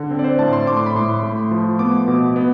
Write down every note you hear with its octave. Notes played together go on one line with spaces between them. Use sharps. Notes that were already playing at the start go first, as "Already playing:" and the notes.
Already playing: D3
C4
D5
C5
A2 A5
C6
A2 D6
C6
B5
A2 C6
A3
F3
B3 D6
B2
B3